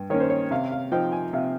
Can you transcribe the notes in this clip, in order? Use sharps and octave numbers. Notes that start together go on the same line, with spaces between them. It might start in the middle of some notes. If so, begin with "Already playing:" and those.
Already playing: G2
D#3 A#3 C#4 C#5
C5
C#5
C3 F5
F5
F3 C4 D#4 G5
G#5
C3 F5